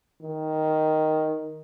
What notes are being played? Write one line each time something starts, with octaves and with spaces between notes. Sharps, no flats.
D#3